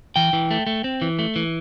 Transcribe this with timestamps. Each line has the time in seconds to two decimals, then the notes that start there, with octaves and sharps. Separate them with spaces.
0.16 E3 G5
0.33 E3
0.51 A3
0.67 A3
0.84 C4
1.02 E3
1.19 A3
1.36 E3